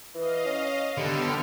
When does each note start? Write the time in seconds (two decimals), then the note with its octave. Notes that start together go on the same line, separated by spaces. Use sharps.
0.15 E3 D#5 F5
0.45 C#4
0.98 D3 G3 B3 G4 A4 F6